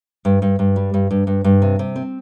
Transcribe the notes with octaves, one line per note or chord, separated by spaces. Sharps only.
G2
G2
G2
G3
G2
G2
G2
G2
C3
C3
C4